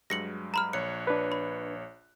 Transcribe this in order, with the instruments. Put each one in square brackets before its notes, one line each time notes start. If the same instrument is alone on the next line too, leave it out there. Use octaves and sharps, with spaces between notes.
[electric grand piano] G2 F#3 G#3 [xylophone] A#6 C#7 F#7
[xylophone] A#5 B5 F6
[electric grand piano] A#1 C#5 F#6 [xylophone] C#7
[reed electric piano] D4 B4
[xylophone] B5